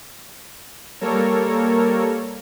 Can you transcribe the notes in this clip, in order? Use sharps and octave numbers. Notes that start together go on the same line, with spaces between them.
G3 A#3 A4 A#4 C#5